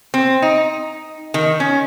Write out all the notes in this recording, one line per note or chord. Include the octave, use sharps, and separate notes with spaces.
C4
D#4
D#3
C#4